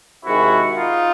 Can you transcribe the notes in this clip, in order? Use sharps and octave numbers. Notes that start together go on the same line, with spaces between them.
C3 D#3 G#3 E4 F#4
D#4 F4